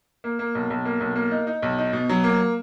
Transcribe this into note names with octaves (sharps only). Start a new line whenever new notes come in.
A#3
A#3
B1
B1
A#3
B1
A#3
D#4
D#4
B1
D#4
B2
F#3
A#3